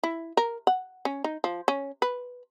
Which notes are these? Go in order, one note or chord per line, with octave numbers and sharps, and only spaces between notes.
E4
A#4
F#5
C#4
D#4
F3
C#4
B4